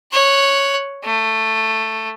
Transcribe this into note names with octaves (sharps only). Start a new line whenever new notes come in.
C#5 F#6
A3